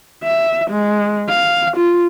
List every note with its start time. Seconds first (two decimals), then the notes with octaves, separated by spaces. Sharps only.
0.23 E5
0.70 G#3
1.29 F5
1.77 F4